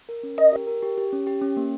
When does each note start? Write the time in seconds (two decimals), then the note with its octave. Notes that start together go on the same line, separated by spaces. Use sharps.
0.09 A#4
0.23 C#4
0.38 A#4 D#5
0.52 G4
0.67 A#4
0.83 G4
0.98 G4
1.13 C#4
1.27 G4
1.42 C#4
1.57 A#3